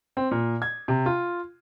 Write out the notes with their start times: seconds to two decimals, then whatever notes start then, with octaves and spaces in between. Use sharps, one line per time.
0.17 C4
0.31 A#2
0.62 G#6
0.88 C3
1.06 F4